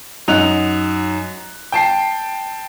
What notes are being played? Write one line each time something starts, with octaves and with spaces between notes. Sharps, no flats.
F#2 D#4 F#5 F#6 F7
G5 A5 C7